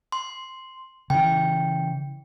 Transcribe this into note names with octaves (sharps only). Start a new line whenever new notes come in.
C6
C#3 E3 G5